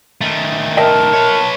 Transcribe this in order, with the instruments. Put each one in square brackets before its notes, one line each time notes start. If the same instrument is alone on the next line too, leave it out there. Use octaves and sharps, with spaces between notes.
[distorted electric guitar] D#3 A3
[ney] A#4 [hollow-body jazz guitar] D#5 E5 G5 [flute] A5
[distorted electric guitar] B4 C#5